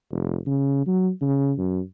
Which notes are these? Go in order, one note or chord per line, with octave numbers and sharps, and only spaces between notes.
F1
C#3
F#3
C#3
F#2